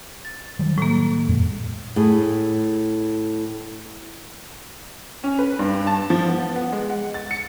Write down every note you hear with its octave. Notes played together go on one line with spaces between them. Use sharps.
A6
D#3 F#3 G3
A2 A#3
F2 A#2 G#3
A2 G#4
C#4
B4
G2
A5
F3
B3
B3
G#3
F#5
A6
C#7